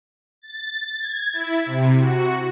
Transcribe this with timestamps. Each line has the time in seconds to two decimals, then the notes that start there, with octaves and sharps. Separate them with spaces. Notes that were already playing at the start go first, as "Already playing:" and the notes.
0.42 A6
0.99 G#6
1.33 E4
1.66 C3
1.99 F#4